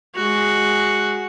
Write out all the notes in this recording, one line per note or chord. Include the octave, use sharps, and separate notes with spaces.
G#3 F#4